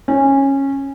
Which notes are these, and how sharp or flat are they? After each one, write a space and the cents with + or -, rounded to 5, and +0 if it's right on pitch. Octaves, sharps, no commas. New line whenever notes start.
C#4 -15